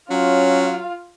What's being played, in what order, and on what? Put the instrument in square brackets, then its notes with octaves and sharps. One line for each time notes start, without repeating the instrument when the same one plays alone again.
[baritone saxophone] F#3 [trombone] C#4 [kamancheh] F4 F5